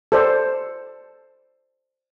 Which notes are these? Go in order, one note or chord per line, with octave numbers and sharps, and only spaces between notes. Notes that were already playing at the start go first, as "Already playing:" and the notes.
A4 C5 D5